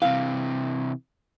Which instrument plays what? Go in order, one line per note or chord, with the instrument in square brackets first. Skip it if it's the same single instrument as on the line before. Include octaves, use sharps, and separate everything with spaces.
[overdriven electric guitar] C3 E3 [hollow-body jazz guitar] F5